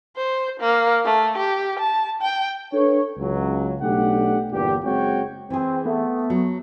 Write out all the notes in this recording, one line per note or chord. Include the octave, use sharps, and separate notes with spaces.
C5
A#3
A3
G4
A5
G5
D4 A4 B4 C#5
C#2 F#3
B1 A3 D4 G4 F#5
G1 E2 A#2 G4
F#1 G#3 C4 F#4 C#5 G5
E3 C4 G#4
A3 B3
F#3